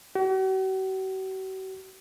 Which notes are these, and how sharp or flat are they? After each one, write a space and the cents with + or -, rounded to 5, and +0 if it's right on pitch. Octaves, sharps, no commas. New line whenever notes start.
F#4 +45